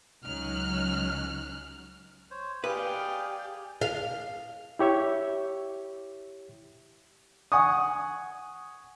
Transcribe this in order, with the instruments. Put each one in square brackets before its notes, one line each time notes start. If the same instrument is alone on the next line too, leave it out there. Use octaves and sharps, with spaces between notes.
[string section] C#2 F#3 C#4 D#4 F6 F#6
[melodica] C5 C#5
[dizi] G4 [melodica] G#4 D5 [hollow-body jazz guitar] B4 [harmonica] F5 G5
[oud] F5
[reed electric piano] E4 G4 C#5 E5
[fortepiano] F#5 G#5 C#6 D#6